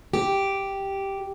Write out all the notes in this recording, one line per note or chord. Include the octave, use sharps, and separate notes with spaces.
G4